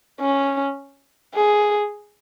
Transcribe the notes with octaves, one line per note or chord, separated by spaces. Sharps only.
C#4
G#4